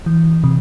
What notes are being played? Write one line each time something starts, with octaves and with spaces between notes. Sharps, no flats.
E3
C3